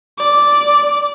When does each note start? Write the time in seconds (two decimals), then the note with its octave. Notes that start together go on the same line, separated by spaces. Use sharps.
0.19 D5